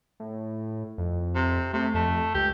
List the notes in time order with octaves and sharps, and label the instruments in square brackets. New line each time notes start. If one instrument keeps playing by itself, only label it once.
[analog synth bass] A2
F2
[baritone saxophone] C3
[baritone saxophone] C3 [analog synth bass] A3
[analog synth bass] F2 [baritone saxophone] A3
[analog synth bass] C#2 [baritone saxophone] G4